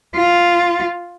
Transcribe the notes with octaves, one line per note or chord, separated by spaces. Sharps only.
F4